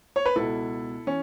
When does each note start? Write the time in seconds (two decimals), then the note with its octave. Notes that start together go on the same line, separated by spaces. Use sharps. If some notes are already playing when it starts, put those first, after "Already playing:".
0.16 C#5
0.26 B4
0.36 C#2 B2 E4 A4
1.07 E3 C#4